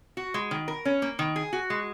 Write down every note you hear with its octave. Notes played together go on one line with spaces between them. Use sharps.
F#4
G#3
D#3
A#4
C#4
A#3
D#3
G#4
F#4
G#3